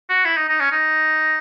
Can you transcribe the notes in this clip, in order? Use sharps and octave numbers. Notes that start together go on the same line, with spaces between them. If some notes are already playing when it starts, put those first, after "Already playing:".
F#4
E4
D#4
D#4
C#4
D#4